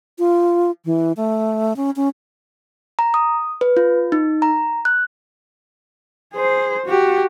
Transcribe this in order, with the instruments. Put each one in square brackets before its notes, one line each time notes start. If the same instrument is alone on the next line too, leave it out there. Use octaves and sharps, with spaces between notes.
[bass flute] F4
E3
A3
C#4
C#4
[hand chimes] A#5
D#6
B4
F4
D#4
A#5
F#6
[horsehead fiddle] G#4 C5
F#4 G4